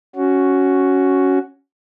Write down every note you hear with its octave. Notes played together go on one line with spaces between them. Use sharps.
C#4 F#4